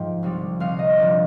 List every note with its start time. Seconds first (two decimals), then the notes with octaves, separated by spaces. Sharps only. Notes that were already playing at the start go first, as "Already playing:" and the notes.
Already playing: G#2 F3 G5
0.23 C2 C3 G3
0.60 C2 C3 G3 F5
0.79 D#5
0.98 D2 C3 F3 D5